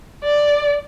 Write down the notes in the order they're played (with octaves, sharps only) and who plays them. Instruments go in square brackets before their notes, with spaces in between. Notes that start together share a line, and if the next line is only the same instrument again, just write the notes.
[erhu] D5